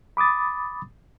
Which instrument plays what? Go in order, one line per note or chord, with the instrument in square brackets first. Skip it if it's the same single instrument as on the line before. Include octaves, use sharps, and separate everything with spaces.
[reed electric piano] B5 D6 D#6 A6